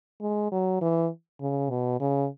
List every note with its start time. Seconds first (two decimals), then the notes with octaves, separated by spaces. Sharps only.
0.21 G#3
0.52 F#3
0.81 E3
1.41 C#3
1.70 B2
2.00 C#3